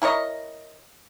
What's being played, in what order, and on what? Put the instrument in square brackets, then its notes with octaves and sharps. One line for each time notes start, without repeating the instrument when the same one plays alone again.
[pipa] E4 A#4 C#5 D#5